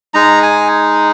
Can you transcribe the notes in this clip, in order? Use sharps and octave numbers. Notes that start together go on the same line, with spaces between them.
G#3 D#4 A#5
G#5